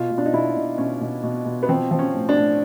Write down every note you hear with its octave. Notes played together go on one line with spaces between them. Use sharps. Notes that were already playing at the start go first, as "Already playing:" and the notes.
Already playing: B2 F4
B2
D4
D#4
B2 E4
B2
B2 C#4
B2
B2
B2
B3
F3 C4
F3
C#4
A2
D4
A2